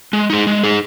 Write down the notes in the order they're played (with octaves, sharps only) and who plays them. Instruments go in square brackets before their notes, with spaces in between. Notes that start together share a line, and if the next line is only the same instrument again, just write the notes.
[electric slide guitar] G#3
D#4 G#4
G#3
D#4 G#4